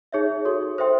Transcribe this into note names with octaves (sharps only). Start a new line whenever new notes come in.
D#4 G#4 C#5 E5
F#4 A4 C#5
A4 C5 E5 G5 C6